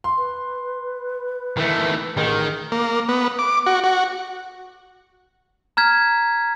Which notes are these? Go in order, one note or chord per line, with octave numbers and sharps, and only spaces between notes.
C6
B4
D#3 E3 A3
A1 D#3 G#4
A#3
B3
D6
F#4
F#4
A#5 F6 G#6 B6